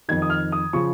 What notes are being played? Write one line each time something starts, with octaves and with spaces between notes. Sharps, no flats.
F2 D#3 G#6
D#6
F6
D#6
C#3 F3 C#6